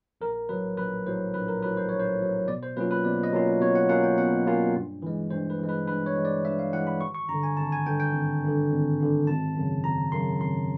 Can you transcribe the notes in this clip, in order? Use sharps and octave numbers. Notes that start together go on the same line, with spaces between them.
A#1 A#4
A2 F#3 B4
A#1 B4
A2 F#3 C5
A#1 B4
A#4
A2 F#3 B4
C5
A#1 C#5
C5
A2 F#3
B2 D5
C5
F#3 A#3 C#4 F4 B4
B4
B2 D5
D#5
F#3 A#3 C#4 F4
B2 C#5
F#5
F#3 A#3 C#4 F4 F#5
G5
B2 F#5
F#3 A#3 C#4 F4
G2
E3 G#3
G2 C5
B4
E3 G#3
B4
G2 B4
C#5
E3 G#3
D5
G2 E5
F5
E3 G#3 F#5
B5
G#1 C#6
C#6
G2 D3 A#5
G#5
G#1 A5
G#5
G2 D3 G5
G5
G#1
G2 D3
G#1
G2 D3
G#1 A5
F#2 C#3
G#1 A#5
F#2 C#3 C6
G#1 C6